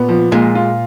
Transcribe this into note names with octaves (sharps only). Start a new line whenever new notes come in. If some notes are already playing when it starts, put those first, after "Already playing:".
Already playing: A#2 B3
F3
A#2 G#3
F4